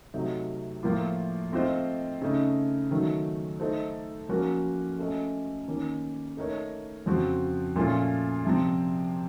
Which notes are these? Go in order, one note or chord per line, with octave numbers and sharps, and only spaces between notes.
C3 F#3 A3 D#4
A2 F3 A#3 F4
A3 C4 F4 C5 D#5
C#3 A3 D#4
D#3 F#3 A3
A3 D#4 A4 C5
F3 A#3 C#4 F#4 A#4
A3 C#4 A4 D#5
D#3 A#3 C#4
A3 D#4 A#4 C#5
F2 C#3 F3 C4 F#4
A#2 F3 A3 C#4 F4
C3 F3 C4